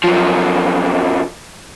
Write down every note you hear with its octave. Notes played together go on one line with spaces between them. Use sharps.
F#2 F3